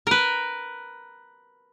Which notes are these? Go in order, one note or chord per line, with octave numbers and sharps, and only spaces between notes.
A#4 B4